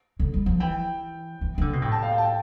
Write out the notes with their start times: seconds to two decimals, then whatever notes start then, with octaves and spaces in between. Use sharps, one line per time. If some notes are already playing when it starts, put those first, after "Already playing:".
0.20 D3
0.34 G3
0.46 F3
0.60 E3 G5
1.41 E3
1.58 E3
1.61 D3
1.73 B2
1.82 A2 G5
1.92 A5
2.02 F5
2.12 G5
2.18 A5
2.22 G5